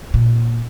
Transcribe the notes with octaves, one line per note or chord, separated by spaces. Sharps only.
A#2